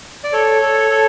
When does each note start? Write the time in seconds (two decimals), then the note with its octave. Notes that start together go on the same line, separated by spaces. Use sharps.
0.24 D5
0.33 A4 C#5
0.62 A4
0.90 A4